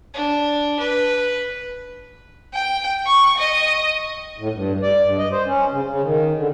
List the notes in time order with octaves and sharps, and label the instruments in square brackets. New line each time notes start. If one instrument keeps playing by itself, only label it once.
[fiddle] D4
B4
[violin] G5
C#6
D#5
[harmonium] A2
G2
D5
G2
D#5
C5
C#4
C#3
C#3
D#3
D3